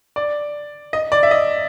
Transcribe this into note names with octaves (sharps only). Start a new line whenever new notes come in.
D5
D#5
D5
E5
D#5